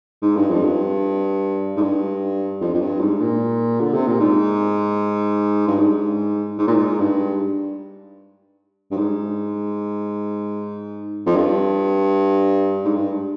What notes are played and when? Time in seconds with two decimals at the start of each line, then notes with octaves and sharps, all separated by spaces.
0.22 G#2
0.36 G2
0.50 F2
0.64 G2
1.76 G#2
1.82 G2
2.61 F2
2.74 F2
2.81 G2
3.00 G#2
3.20 A#2
3.80 D3
3.93 C3
4.07 A#2
4.20 G#2
5.68 G2
5.79 G#2
6.58 G#2
6.67 A#2
6.75 G#2
6.99 G2
8.91 G2
8.97 G#2
11.26 F2
11.35 G2
12.84 G#2
12.95 G2